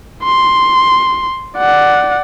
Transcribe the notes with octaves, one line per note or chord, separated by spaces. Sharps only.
C6
D5 F#5